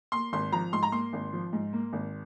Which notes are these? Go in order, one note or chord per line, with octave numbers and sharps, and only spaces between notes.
A#3 C6
G#1 C6
F3 A#5
G#2 C6
A#5
A#3 C6
G#1
F3
G#2
A#3
G#1